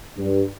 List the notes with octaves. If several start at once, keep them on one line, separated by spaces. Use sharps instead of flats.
G2